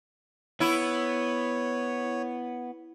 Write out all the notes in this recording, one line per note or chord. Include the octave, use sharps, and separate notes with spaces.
B3 E4 C#5